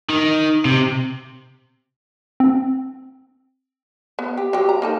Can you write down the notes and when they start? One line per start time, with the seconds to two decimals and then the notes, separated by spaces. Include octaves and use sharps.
0.10 D#3
0.65 C3
2.40 C4
4.19 B3
4.37 G4
4.53 F#3 G4
4.69 A#5
4.82 A#3 D#4 A4